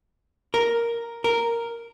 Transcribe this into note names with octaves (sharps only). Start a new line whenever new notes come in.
A#4
A#4